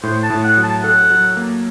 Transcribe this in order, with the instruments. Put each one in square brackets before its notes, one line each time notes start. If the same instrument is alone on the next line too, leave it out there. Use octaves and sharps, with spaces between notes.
[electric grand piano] A2 [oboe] C5
[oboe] A5
[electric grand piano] A2
[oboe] F#5
[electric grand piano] F#3
[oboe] A5
[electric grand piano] A4 [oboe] F#5
[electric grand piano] F#3
A#3